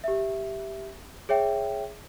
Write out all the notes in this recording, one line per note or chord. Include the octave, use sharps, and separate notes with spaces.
G4 E5
G#4 C#5 E5 G5